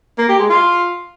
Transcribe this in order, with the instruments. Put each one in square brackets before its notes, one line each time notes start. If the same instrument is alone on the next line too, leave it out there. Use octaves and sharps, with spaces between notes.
[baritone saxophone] A#3
G4
G#3
F4